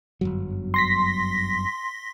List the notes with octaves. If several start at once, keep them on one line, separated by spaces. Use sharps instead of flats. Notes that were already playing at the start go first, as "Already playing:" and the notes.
G1 F#2 F#3
C6 A#6 B6